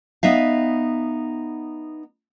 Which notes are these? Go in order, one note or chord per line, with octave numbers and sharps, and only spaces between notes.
B3 D#4 E5 F5